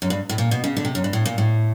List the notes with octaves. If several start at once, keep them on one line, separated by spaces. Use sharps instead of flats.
F#2
G2
A2
A#2
B2
C#3
D3
C3
F#2
G2
A2
A#2
A2